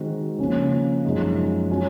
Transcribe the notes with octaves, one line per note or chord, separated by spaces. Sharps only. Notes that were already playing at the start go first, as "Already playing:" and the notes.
Already playing: D#3 G#3 C4 F#4
C#3 F3 A#3 C#4
F#2 F3 G#3 D#4
F#3 C#4 F#4